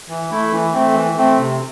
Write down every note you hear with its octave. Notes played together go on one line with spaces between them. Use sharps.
E3
A3 E4
E3
A3 C4
E3
A3 C4
C3